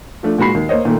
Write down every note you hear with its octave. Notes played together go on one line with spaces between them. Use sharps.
F3 A3 D4
A#2 G#3 F#4 B5 C7
D#2
A#3 C5 C#5 D#5
A#2 D#3 A3